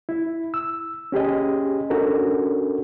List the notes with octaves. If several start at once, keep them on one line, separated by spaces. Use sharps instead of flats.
E4
E6
C#4 G4 G#4 D#5
C#4 D4 F#4 A4 A#4